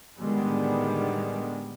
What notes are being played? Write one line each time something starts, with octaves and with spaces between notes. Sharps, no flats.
A2 D3 D#3 G3 G#3 B3